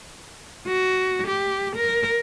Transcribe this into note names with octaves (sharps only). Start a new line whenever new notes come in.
F#4
G4
A#4